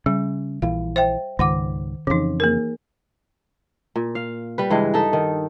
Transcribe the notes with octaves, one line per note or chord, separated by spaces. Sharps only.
C#3 G3
A#1 E3 F5
C5 E5 G5
C#2 G#2 D#3 F#5 D6
F2 C#3 E3 D#4
A#3 G#4 A#4
A#2
F5
G3 B4
G2 C#3 E3 G#3
D#4 A4 E5
D#3